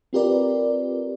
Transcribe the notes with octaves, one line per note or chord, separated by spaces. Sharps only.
C4 F4 G4 A#4 B4 D5